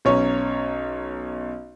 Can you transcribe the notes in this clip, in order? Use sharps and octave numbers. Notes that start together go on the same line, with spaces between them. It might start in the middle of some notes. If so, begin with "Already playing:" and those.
B1 C#4 C#5